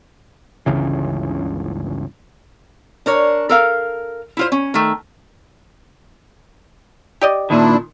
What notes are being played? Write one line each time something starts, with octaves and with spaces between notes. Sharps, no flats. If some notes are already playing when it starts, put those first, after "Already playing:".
G1 C#2 C#3 E3
D4 A#4 C#5
A4 A#4 F5
E4 F4 C5
C#4
D#3 A3
G4 D5 D#5
A#2 D#3 D4 E4